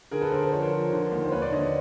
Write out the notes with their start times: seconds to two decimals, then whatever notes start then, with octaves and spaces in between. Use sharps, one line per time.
0.11 D3 G#4 A#4
0.21 A4 B4
0.31 D3 A#4 C5
0.42 C5
0.52 F3 C#5
0.62 A#4 C5
0.72 F3
0.92 D3
1.12 D#2
1.25 C5
1.32 D#2 B4 C#5
1.42 C5 D5
1.52 D3 C#5 D#5